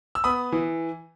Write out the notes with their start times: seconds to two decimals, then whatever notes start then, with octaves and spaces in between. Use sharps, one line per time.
0.15 E6
0.24 B3 B5 D#6
0.52 E3